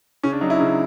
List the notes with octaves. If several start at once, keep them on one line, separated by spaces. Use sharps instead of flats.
C#3 C#4
D4
F#3 D#4
E4
C#3